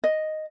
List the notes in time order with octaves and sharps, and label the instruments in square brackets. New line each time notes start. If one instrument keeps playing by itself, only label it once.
[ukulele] D#5